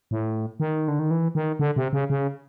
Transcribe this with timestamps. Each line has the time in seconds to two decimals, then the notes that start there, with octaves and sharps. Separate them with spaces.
0.11 A2
0.60 D#3
0.88 D3
0.99 D#3
1.11 E3
1.35 D#3
1.59 D3
1.76 C3
1.93 C#3
2.10 C#3